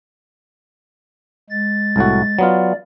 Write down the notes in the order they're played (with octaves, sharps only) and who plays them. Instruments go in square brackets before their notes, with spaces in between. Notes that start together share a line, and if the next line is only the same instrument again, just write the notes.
[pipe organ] G#3 A6
[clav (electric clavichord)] C2 A2 F#4
[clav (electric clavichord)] F#3 B3 F4 [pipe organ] D5